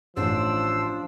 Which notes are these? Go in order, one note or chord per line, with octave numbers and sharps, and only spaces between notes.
A1 F3 D4 C5 E6